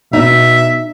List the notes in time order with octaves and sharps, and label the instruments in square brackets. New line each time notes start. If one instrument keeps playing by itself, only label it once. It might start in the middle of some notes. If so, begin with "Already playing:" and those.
[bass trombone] B2 [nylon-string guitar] D#4 [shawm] E5